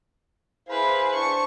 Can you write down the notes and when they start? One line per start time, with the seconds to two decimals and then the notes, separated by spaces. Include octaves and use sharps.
0.69 E4 G#4 B4 C5 F5
1.15 D4 C5 A5 C#6